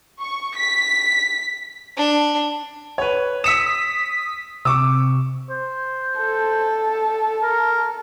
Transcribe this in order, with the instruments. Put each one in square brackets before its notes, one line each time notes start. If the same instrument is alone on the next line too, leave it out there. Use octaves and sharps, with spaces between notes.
[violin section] C#6
B6
[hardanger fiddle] D4
[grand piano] B4 C#5
[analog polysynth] D#6 B6 [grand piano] E6 C#7 E7
[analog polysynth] C3 [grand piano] C#6 D6 E6
[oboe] C5
[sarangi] A4
[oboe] A#4